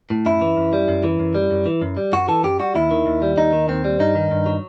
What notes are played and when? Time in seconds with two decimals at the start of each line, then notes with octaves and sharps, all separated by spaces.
0.10 A2
0.26 F#2 E4
0.41 E3
0.57 F#2
0.73 G3
0.88 F#2
1.04 E3
1.19 F#2
1.35 G3
1.51 F#2
1.66 E3
1.82 F#2
1.97 G3
2.12 F#2 F#4
2.28 E3 A4
2.43 F#2 G4
2.59 G3 F#4
2.75 D#2 E4
2.91 D#3
3.06 D#2
3.22 G3
3.37 D#2 D#4
3.52 D#3
3.68 D#2 C4
3.84 G3
4.00 G2 D#4
4.15 D#3
4.31 G2
4.46 F#3